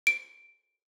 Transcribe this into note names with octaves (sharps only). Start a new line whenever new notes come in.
D7